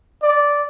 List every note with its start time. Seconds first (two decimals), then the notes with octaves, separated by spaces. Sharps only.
0.23 D5